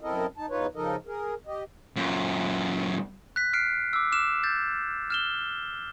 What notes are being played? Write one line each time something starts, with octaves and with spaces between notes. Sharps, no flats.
F#2 C4 E4 A4 A#4 D#5
D#4 A5
E2 D#4 F4 B4 C#5
C#3 F3 D#4 A4 A#4 D#5
G#4 A#4
G4 D#5
F#2 A#2
F#6 B6
F6 C7 D7
D6 E6
D6 F6 E7
G6 A6
F6 E7 G7